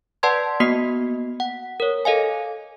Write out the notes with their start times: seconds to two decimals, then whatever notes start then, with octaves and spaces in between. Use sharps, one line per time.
0.23 B4 D5 F#5 A5 C6 G#6
0.60 A#3 B3 F#4 D#5 C7
1.40 F#5
1.80 A#4 C#5
2.05 A4 D#5 F5 G#5